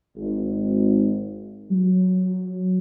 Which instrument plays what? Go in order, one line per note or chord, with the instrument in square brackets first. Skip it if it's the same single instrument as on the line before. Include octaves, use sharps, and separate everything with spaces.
[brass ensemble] G#1
F#3